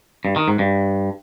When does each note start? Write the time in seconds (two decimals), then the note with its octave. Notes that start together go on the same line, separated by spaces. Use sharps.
0.25 G2
0.36 D#3
0.48 G#2
0.59 G2